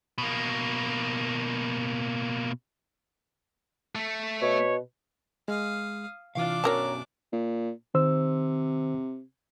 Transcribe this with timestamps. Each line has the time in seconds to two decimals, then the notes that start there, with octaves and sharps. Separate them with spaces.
0.18 B2 A#3
3.95 A3
4.42 B2 C#5
5.48 G#3 F5 D#6
6.35 C3 E3 D4 F4 F5 D6
6.64 B2 F#3 C#4 A#4 C#5 A5 A#5
7.33 A#2
7.94 C3 D#3 C5 E6